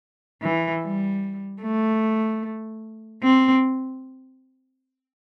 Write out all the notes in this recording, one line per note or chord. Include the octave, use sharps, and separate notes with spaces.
E3
G3
A3
C4